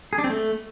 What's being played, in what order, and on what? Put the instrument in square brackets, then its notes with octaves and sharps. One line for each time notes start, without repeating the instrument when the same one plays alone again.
[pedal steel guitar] G#4
D4
C4
A3